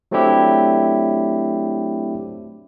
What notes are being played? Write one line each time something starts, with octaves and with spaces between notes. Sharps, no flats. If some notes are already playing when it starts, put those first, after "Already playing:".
F#3 A3 C4 D4 E4 G4